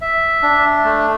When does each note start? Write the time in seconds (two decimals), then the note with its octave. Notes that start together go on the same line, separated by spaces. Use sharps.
0.01 E5
0.43 D4
0.84 A3